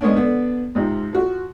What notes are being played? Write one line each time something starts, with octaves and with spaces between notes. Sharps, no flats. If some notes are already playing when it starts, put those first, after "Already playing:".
G#3 B3 C#4 D4
D3 B3 D4
G#2 C3 F3
F3 F#4